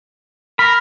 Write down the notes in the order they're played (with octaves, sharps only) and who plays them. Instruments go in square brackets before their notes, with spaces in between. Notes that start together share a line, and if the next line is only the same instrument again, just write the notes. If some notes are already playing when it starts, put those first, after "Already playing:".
[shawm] A#4 [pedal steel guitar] B5